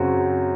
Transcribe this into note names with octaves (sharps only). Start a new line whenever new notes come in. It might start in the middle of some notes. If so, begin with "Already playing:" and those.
Already playing: F#2 C#3 F#3 C4 F#4